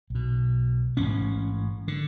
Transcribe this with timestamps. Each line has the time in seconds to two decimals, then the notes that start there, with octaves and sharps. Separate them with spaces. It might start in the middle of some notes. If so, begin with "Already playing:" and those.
0.10 B1 B2
0.97 A1 G#2 C#4
1.88 D3